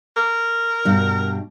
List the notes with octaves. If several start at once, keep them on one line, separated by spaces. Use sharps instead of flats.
A#4
G2 B2 G3